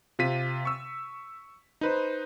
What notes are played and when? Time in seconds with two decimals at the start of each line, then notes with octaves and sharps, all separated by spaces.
0.19 C3 F4 B6 D#7
0.65 C#6 E6
1.81 D#4 B4 C5